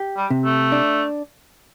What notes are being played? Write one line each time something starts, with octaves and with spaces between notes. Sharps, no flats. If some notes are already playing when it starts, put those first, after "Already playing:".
Already playing: G4
G3
C3
A3
D4